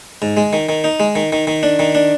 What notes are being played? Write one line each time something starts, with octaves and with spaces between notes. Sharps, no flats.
G#2
G#3
D#3
D#3
D#4
G#3
D#3
D#3
D#3
D4
D#3
D4